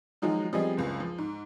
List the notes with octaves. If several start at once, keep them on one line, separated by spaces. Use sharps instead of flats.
D#3 F3 F#3 G#3 D#4 F#4
F3 G3 B3 C4 G#4 D#5
F#1 C#2
F3
G#2